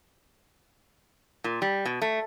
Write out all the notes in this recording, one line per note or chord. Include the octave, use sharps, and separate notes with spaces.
A#2
G3
B2
A3